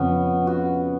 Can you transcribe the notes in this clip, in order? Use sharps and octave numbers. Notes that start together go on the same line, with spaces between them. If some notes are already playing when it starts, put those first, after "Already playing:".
Already playing: F2 C#3 F3 B3 C#4
F#4